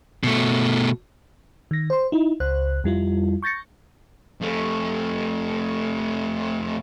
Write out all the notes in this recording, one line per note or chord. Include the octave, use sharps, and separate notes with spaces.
B2 A3
D#3 A#6
C5 C6
D#4 E4
C#2 C5 F#6
F2 G3 E4 F4
C#6 G6 A6 A#6 C#7
F2 A3